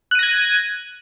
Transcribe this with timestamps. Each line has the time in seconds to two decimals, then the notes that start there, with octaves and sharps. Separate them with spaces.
0.11 F#6
0.15 D#7
0.19 A#6
0.23 G#6